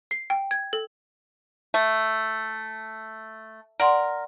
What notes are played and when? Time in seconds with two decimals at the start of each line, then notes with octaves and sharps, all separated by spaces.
0.11 C7
0.30 G5
0.51 G#6
0.73 A4
1.74 A3
3.80 A#4 D5 F#5 C6